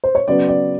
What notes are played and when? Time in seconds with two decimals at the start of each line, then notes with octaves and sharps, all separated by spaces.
0.04 C5
0.15 C#5
0.28 C#3 F#3 B3 D5
0.48 D5